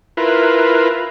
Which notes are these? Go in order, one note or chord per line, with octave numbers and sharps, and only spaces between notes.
E4 F4 A#4 B4